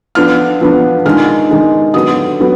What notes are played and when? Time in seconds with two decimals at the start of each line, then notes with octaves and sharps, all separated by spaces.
0.15 F3 B3 D4 F6
0.61 F3 B3 D4
1.05 D#3 G#3 D4 F6
1.49 D#3 G#3 D4
1.94 D3 F#3 B3 D4 D#6
2.39 D3 F#3 B3